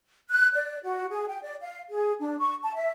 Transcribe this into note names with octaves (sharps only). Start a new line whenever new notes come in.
F#6
D5
F#4
G#4
G5
D5
F5
G#4
D4
C#6
A5
E5